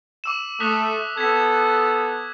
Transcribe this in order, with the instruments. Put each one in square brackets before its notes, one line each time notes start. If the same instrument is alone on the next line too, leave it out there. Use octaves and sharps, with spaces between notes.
[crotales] D6 E6 E7
[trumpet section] A3 [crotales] D#6 F#6 B6
[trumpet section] B3 A4 [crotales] G#6 B6